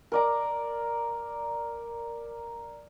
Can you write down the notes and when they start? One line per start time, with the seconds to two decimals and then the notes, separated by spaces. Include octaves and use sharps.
0.12 A#4 D5 A#5